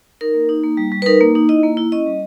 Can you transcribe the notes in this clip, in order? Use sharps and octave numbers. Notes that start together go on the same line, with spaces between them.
D#4 A#4
A#3
D#4
A#3
G3
G3
B4
D#4 A#4
A#3
D#4
E4 D#5
A#3
E4
C#4 D#5
G3